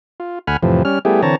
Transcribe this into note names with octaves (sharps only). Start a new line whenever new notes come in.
F4
D2 F#5 G#5 B5 F6
F2 A2 C3 E3 F3
G3 C#4 F6
G3 A3 B3 E4 G4 G#4
D3 E3 C4 C#5 A5 A#5